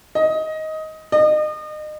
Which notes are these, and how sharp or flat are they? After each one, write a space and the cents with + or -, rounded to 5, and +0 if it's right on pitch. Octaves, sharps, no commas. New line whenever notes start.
D#5 +15
D#5 -35